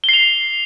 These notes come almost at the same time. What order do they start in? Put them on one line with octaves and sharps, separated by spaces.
G7 C7 F7